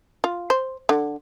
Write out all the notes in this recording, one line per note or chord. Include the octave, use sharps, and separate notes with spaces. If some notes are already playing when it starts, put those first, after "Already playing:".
F4
C5
D3